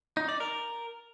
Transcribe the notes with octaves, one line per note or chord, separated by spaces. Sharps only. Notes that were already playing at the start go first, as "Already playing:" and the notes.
D#4
D5
A#4